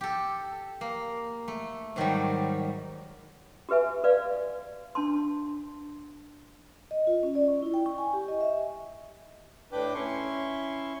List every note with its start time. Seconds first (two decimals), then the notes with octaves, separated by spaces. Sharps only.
0.01 G4 A4
0.81 A#3
1.48 A3
1.96 G#2 D#3 F#3 G3
3.69 F#4 G4 B4 E5 G#5
4.03 F#4 B4 D5 F5
4.95 D4 A5 C6
6.91 D#5
7.07 F4
7.23 C#4
7.35 D5
7.48 C#6
7.63 E4
7.74 G5
7.86 C#6
7.98 G#5
8.13 G4
8.28 D#5
8.41 E5
9.72 A2 D4 B4 G5 D6
9.95 C#4 E4 C6 C#6